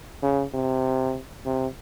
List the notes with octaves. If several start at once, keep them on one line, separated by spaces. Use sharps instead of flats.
C#3
C3
C3